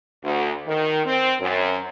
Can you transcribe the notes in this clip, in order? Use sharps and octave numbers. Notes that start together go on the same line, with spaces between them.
D2
D#3
C4
F#2